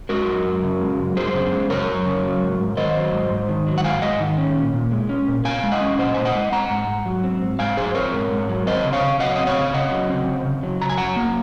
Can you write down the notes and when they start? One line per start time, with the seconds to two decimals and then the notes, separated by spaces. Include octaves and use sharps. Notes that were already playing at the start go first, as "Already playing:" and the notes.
0.09 G#3 F#4 A#4
0.27 F#2
0.45 F#2
0.63 C#3
0.81 G#3
0.99 F#2
1.16 F#2 G#4 C5
1.34 C#3
1.52 G#3
1.70 F#2 A#4 C#5
1.88 F#2
2.05 C#3
2.23 F#3
2.41 G#2
2.59 G#2
2.77 D#3 C5 D#5
2.95 F#3
3.12 G#2
3.31 G#2
3.49 D#3
3.67 F#3
3.78 F#5
3.84 G#2 F5 G#5
4.02 G#2 D#5 F#5
4.20 D#3
4.38 C#4
4.56 A#2
4.74 A#2
4.91 G#3
5.09 C#4
5.28 A#2
5.45 A#2 F5 G#5
5.63 G#3
5.72 D#5 F#5
5.81 C#4
5.98 A#2 C5 D#5
6.14 A#2 G#5
6.25 D#5 F#5
6.35 G#3
6.52 C4 F#5 A#5
6.70 G#2
6.87 G#2
7.06 F#3
7.24 C4
7.41 G#2
7.59 G#2 F5 G#5
7.77 F#3 G#4 C5
7.95 C4 A#4 C#5
8.13 G#2
8.30 G#2
8.49 F#3
8.67 C4 C5 D#5
8.85 C#3
8.93 C#5 F5
9.02 C#3
9.19 F#3 D#5 F#5
9.36 C4 D#5
9.47 C#5 F5
9.56 C#3
9.74 C#3 D#5 F#5
9.92 F#3
10.09 C4
10.27 C#3
10.45 C#3
10.63 F#3
10.81 F#3 A#5
10.90 G#5
10.97 F#2 F#5 A#5
11.16 A#3